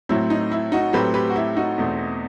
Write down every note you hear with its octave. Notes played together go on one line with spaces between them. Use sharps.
A2 F#3 A3 C4 E4
D#4
E4
D#4 F#4
A2 F#3 A3 C4 G4 B4
G4 B4
F#4
E4 G4
D#4 F#4
E2 B2 A3 C4